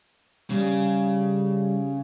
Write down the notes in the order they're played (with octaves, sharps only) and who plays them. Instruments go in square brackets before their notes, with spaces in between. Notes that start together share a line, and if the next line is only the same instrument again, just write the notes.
[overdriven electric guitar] C#3 [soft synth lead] G3